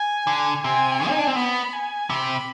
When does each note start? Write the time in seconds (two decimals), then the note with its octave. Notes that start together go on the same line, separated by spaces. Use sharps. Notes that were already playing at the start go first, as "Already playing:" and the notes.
Already playing: G#5
0.27 D3
0.63 C3 G#5
1.09 D#4
1.18 D4
1.27 C4
1.36 B3 B5
1.73 G#5
2.09 C3 B5